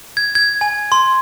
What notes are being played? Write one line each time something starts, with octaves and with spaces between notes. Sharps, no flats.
G#6
G#6
G#5
C6